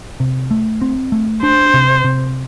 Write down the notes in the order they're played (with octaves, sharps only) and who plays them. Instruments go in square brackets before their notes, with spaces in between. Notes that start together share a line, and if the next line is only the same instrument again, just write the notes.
[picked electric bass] C3
A3
C4
A3
[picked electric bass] D4 [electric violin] C5
[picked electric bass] C3
C3